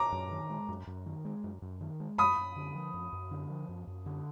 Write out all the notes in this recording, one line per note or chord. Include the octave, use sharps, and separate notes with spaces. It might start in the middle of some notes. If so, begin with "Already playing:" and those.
Already playing: A#5 D6
F#2
D#3
G#3
F#2
F#2
D#3
G#3
F#2
F#2
D#3
G#3
F#2 B5 D#6
F#2
D3
F3
F#2
F#2
D3
F3
F#2
F#2
D3